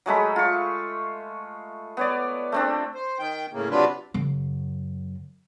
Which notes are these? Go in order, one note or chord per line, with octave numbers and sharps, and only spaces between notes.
F#3 G#3 A3 B5
F4 C#6
B3 C#5 D5
A3 C4 D4
C5
D#3 G5
A2 C#3 A#3
C3 F#3 D4 F4 B4
F#2 C#3